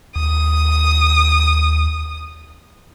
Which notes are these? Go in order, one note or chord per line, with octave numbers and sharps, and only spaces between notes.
D#2 D#6